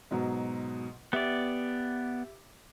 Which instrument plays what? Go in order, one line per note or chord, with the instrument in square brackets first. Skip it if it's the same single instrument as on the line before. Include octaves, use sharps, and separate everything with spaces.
[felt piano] G#2 B2 F#3
[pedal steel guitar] B3 D5 [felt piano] G4 E5